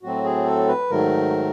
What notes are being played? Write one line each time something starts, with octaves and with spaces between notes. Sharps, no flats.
A2 F#3 A3 C4 F#4
G#4
A4
B4
G#2 D#3 F#3 A3 A#4